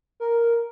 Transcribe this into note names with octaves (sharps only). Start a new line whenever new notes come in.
A#4